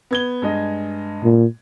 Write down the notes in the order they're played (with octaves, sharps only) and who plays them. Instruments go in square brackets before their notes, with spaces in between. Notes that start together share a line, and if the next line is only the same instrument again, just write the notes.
[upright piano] B3 G#6 G7
G2 G#3 D#5
[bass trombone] A#2